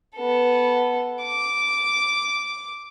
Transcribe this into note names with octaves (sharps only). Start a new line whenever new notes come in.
B3 A4
D6